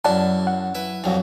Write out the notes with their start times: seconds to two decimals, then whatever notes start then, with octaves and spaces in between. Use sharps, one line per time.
0.04 F#2 E4 D5 F#5 A5 C6
0.47 F#5
0.75 E4 B4
1.04 C2 F2 F#3